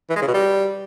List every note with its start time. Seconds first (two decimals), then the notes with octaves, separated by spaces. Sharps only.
0.10 E3
0.16 G#3
0.22 C#3
0.28 B2
0.34 G3